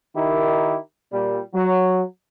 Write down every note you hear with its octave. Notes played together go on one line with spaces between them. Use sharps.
D#3 D#4 E4 G4 A#4
A#2 G3
F#3